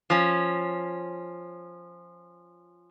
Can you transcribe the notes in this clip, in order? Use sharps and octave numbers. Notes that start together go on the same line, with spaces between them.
F3 C#4